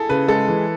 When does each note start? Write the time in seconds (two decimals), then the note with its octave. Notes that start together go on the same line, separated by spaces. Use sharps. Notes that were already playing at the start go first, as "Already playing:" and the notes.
Already playing: E4 G#4 A4
0.09 C#3 B4
0.28 G#3 A4
0.48 E3